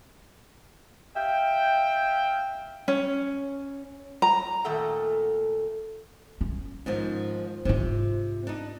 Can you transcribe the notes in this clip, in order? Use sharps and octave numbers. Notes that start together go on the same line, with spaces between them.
E5 F5 G5
C#4
A#5
A#2 D#3 A3 A4 F#5
C#4
G#2 D#3 F3
G#2 C3 F4
D4 D#4